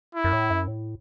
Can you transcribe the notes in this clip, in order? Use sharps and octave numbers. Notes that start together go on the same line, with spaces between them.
E4
F#2
A2
F#2
A2